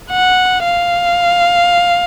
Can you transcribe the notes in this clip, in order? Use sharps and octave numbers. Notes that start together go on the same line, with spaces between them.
F#5
F5